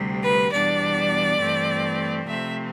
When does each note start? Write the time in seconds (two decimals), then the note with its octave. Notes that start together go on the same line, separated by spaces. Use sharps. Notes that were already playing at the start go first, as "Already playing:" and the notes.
Already playing: D2 C3 G3
0.22 B4
0.52 E2 B2 G3 D4 D5
1.40 G2 E3 A3 C4
2.27 C3 F3 A3 C4 E5